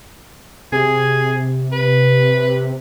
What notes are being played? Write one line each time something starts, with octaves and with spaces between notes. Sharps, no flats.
C3 G#4
B4